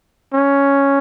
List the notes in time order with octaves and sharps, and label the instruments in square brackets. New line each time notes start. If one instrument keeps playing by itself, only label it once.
[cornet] C#4